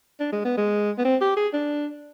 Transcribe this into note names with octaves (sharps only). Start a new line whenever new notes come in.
D4
G#3
B3
G#3
B3
C4
G4
G#4
D4